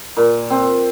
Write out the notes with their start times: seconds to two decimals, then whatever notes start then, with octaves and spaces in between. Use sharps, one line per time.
0.17 A#2
0.50 C4